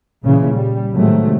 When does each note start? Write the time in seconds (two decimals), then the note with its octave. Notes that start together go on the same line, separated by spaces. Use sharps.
0.24 A#2 C#3 E3
0.53 G3
0.95 A2 C3 D#3 F#3 G#3 A3